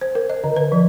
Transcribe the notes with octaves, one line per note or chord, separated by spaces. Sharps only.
C5
A#4
D#5
D3
B4
F3